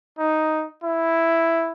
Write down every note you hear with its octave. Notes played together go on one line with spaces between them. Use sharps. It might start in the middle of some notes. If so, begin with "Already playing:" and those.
D#4
E4